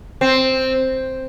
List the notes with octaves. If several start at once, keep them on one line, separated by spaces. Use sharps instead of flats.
C4